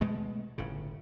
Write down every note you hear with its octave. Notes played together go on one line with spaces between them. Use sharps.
B2 G#3 A3
G1 A2 C#3